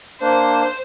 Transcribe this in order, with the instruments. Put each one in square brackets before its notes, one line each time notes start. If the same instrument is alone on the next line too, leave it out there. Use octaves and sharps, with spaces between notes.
[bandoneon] A#3 D4 [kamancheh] C5